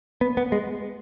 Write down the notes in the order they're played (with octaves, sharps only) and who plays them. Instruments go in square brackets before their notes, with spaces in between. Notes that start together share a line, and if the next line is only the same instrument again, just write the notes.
[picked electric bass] B3
B3
G#3